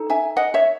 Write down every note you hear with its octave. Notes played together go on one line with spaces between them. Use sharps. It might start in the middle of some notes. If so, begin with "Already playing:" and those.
Already playing: D#4 A4
E5 G#5
D#5 F#5
C#5 E5